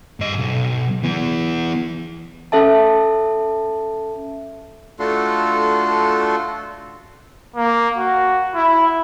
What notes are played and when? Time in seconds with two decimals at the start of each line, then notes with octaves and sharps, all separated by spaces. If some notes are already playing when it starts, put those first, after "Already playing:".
0.20 G2 D#5
0.38 B1
1.03 E3 B3
2.52 C#4 A4 E5 A5
5.00 A3 D4 F4 F#4 A4 C6
7.56 A#3
7.98 F#4
8.55 E4